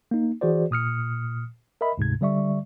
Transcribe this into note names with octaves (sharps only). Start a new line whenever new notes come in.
A#3 D#4
E3 F#4 G#4 C5 D5
A#2 D#6 F6 C#7
A#4 D#5 E5 B5
D2 G#2 C3 G#6
D3 G3 D5 E5 C#6